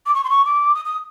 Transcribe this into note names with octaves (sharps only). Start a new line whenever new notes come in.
D6
C#6
C6
C#6
D6
D#6
D#6